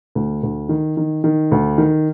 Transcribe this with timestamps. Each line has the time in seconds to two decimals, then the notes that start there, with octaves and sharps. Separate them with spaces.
0.15 D2
0.43 D2
0.69 D#3
0.97 D#3
1.24 D#3
1.51 D2
1.78 D#3